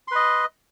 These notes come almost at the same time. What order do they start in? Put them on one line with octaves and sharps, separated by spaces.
C6 B4 D#5